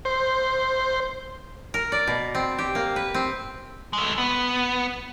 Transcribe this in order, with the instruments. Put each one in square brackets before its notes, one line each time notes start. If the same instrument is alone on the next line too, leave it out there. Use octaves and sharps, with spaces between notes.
[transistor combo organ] C5
[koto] A#4
D5
B2
C4
G4
A#3
B4
C4
[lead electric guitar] G#3 A3
B3